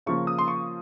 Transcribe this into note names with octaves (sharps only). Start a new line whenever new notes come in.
C#3 F3 A#3 C#6
D#6
C6
C#6